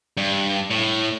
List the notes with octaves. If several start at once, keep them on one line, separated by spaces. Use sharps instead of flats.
G2
A2